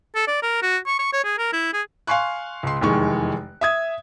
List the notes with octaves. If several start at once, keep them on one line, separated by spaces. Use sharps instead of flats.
A4
D5
A#4
F#4
C#6
C#6
C#5
G#4
A#4
E4
G#4
F5 G#5 C6 C#6 F#6
C#2 C6
F1 E2 D#3 G#3 C#6
E5 D#6 G#6